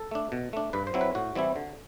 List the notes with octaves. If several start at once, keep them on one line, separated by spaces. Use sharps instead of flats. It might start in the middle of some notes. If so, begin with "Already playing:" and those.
Already playing: A4
A3 D4
B2
A3 D4
G2 B4
C5
F#3 C4 E4
B4
A2 F#4
E3 G3 C4 E4
D3